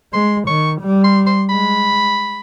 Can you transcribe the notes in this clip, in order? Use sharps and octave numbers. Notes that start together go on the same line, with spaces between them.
G#3 C6
D#3 C#6
G3
C6
C6
G#3 B5